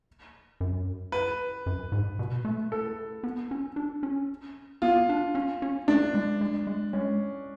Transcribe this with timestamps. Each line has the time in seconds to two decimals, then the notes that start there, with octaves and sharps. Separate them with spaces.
0.60 F#2
1.12 B4
1.66 F#2
1.92 G#2
2.19 B2
2.45 A3
2.72 A4
3.23 B3
3.51 C#4
3.76 D4
4.03 C#4
4.82 B3 F4
5.09 D4
5.35 C#4
5.62 C#4
5.88 A3 D4
6.15 G#3
6.41 G#3
6.67 G#3
6.93 G#3 C#4